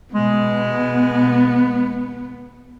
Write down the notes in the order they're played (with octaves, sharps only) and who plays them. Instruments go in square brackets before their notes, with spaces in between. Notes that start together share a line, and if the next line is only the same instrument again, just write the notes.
[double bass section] B2 [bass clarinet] G#3 [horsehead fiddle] B3